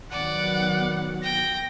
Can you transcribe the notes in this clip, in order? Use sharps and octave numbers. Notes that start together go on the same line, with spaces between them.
D#3 F#3 B3 D5 F#5
G5 A#6